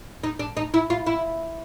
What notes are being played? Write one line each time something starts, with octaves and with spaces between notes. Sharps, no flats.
D#4
D4
D#4
E4
F4
E4